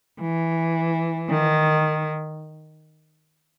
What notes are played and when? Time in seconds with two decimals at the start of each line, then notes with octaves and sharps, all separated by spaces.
0.21 E3
1.30 D#3